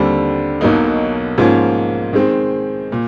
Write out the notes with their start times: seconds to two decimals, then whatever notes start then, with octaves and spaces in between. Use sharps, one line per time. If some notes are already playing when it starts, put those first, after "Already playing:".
Already playing: D#2 D3 G3 C4
0.61 B1 B2 F#3 A#3 D#4
1.38 G#2 F3 A#3 C#4
2.13 D#3 G#3 C4
2.92 A#2